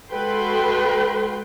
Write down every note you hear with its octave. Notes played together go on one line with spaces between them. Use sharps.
G#3 F#4 A4 B4 G5 C6